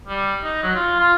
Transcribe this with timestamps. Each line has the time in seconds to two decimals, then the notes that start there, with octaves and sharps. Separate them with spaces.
0.07 G3
0.43 D#4
0.63 F#3
0.75 F4
0.99 F4